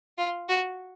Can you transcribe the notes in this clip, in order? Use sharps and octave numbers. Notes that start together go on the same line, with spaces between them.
F4
F#4